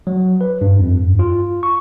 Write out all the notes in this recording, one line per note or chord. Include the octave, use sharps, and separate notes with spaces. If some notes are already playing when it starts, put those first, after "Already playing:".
F#3
B4
G2
F2
G2
F4
C#6